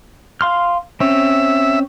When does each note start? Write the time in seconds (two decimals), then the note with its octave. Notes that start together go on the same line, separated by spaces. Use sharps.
0.41 F5 C6 F6
1.00 C4 C#4 E5